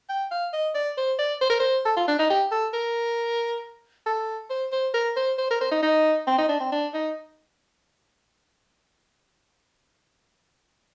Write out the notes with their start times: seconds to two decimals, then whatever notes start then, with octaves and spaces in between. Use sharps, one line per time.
0.09 G5
0.31 F5
0.53 D#5
0.75 D5
0.97 C5
1.19 D5
1.41 C5
1.50 A#4
1.59 C5
1.85 A4
1.96 F4
2.08 D4
2.19 D#4
2.30 G4
2.51 A4
2.73 A#4
4.06 A4
4.50 C5
4.72 C5
4.94 A#4
5.16 C5
5.38 C5
5.50 A#4
5.61 C5
5.71 D#4
5.82 D#4
6.27 C4
6.38 D#4
6.49 D4
6.60 C4
6.72 D4
6.94 D#4